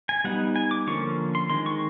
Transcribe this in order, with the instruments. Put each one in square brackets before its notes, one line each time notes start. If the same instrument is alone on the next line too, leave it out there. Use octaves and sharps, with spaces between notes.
[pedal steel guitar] G#5
G3 B3 D#4 F#5
G#5
D6
D3 F3 A#3 C#4 C#6
C6
D#3 G#3 C4 C6
C#6